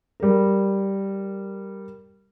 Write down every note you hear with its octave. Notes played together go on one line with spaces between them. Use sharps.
G3 A#4